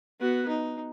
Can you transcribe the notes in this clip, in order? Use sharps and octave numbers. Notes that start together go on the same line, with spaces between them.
B3 F#4
D#4